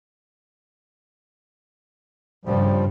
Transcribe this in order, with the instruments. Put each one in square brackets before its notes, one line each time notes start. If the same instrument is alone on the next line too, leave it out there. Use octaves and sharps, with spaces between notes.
[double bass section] G2 C#3 [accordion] F3 G3